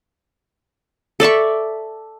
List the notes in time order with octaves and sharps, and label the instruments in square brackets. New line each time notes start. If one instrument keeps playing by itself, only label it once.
[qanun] A4 D5 E5 C#6